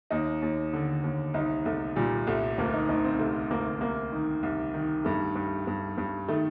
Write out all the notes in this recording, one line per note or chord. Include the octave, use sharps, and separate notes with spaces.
D#2 D#4
D#2
D3
D#2
C2 D#4
C2 A3
A#2 G3
C2 A3
D2 A#3
D#4
D2 D#4
C4
C3 A3
D2 A#3
C2 A#3
D#3
C2
D#3
G2 A3
G2
G2
G2
D#3 A3